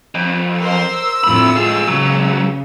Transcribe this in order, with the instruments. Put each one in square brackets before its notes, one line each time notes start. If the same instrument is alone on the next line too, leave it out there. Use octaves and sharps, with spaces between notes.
[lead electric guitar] F2
[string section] A#4 C5 [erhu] E6
[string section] F2 A2 D3 [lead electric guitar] C4 B5
[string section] G#3 [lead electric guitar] F4 G#4
[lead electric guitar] C#2 F#3 [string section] C#3